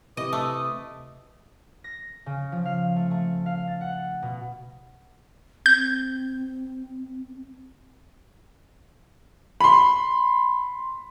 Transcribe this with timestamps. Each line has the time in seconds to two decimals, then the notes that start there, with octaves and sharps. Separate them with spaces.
0.17 C3 E3 D#5 D6 D#6
0.33 A3
1.84 A#6
2.26 C#3
2.52 F3
2.65 F5
2.96 A3
3.11 A3
3.46 F5
3.68 A6
3.81 F#5
4.22 B2
5.66 C4 G6
9.61 B5 C6